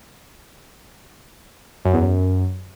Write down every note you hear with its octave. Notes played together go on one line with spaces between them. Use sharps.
F#2
E2
F#2